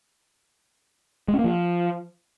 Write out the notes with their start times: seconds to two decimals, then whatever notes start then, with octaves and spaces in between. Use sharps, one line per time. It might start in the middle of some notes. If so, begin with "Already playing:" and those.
1.28 G#3
1.34 C#4
1.39 A#3
1.44 F3